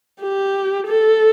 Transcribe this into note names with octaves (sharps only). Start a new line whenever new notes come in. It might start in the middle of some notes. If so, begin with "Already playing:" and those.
G4
A4